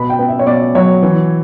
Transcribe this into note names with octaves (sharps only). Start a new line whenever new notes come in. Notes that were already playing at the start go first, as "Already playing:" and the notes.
Already playing: B2 B3 B5
G5
B3
E5
C#5
B2 D5
F#3 C#5
E3